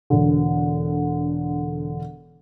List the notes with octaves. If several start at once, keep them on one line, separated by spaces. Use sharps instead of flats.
E1 D3